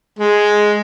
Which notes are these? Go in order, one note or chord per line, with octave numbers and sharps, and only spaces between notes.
G#3